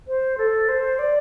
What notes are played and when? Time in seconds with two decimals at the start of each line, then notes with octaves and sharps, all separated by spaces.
0.08 C5
0.38 A4
0.69 C5
0.99 D5